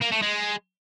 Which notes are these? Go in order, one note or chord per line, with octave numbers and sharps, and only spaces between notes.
A#3
A3
G#3